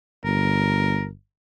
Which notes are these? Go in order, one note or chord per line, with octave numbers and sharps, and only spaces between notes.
G1 A#4